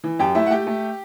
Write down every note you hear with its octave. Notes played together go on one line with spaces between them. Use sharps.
E3
F#2 G4 G5
A3 E4 E5
F#5
A3 G4 G5
A3